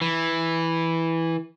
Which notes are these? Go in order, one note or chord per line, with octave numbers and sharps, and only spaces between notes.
E3